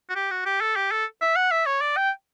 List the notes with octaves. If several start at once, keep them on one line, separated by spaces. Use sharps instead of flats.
F#4
G4
F#4
G4
A4
G4
A4
E5
F#5
E5
C#5
D5
G5